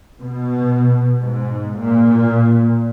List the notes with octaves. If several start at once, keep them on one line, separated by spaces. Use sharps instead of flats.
B2
G#2
A#2